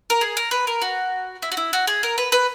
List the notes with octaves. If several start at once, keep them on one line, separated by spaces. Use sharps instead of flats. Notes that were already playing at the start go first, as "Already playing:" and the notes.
A#4
G#4
A#4
B4
A#4
F#4
E4
F#4
E4
F#4
G#4
A#4
B4
B4